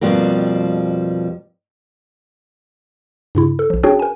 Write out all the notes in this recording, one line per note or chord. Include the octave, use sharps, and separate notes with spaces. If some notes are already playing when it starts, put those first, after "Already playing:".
F2 G#2 B2 F3 G3 A#3
G2 C#3 E4
A4
A#1 F3
C#4 D4 F#4 G#4 C#5 G5
A#4 G#5